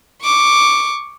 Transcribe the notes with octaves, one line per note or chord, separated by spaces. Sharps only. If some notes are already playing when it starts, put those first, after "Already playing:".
C#6 D6